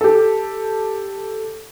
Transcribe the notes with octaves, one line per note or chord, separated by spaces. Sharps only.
G4 A4